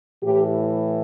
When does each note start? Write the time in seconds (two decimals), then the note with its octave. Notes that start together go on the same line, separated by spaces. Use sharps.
0.23 A2 E3 G4